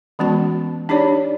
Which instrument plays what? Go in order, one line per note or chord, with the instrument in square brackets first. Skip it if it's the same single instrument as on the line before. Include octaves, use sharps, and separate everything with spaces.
[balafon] E3 G#3 B3 C#4 F#4 A5
D4 D#4 G4 C#5 D5